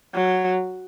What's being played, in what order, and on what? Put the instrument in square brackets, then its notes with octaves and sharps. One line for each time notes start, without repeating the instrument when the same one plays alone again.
[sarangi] F#3